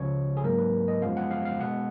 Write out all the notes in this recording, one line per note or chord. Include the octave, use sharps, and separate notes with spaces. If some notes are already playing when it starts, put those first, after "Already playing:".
Already playing: C#2 C#3 F3 C#5
G#4
G#2 F#3 A#3 A#4
B4
D#5
F#2 F3 G#3 B3 F5
F#5
F5
F5
B2 G#3 B3 F#5